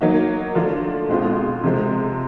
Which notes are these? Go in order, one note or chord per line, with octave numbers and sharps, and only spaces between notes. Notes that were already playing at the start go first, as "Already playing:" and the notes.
F#3 A#3 D#4 F#4
D3 F3 A3 D4 F4
B2 G#3 C4 F4
C3 F3 G#3